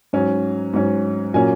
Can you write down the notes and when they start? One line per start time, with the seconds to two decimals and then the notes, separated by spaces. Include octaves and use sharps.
0.13 G#2 F#3 C#4
0.74 G#2 F#3 C#4
1.34 A#2 F#3 A#3 C#4 G#5